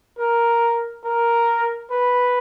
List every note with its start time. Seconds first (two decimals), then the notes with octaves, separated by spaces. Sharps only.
0.18 A#4
1.04 A#4
1.91 B4